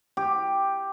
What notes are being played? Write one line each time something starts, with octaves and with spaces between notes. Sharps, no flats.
G4